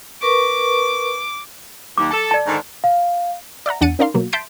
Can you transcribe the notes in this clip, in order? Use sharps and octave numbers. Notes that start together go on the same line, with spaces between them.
A#4 B4 C#6 D6
D#2 D6
A4
D5 A5
G#2 D3 D#3
F5
D5 E5 F#5 A#5
E2 D4 F#5 A6 C#7 D#7
C#4 D#4 A#4 D5 F5 C6
B2 F#3 A#3
E5 A5 C6 G6 B6 D7